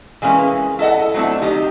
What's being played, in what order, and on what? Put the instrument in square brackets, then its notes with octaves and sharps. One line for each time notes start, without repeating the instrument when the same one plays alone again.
[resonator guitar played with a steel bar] E3 G#3 A#3 C#4 B4
E4 A4 D#5 F#5
F#3 A3 C4 D4 E4
D#3 D#4 G4